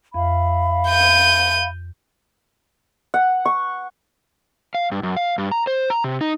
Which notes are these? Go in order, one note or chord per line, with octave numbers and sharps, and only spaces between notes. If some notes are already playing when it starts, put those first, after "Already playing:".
F2 E5 F5 B5
G6 D#7
F#5
C#6
F5
G2
F#2
F5
G2
A#5
C5
A#5
C3
D#4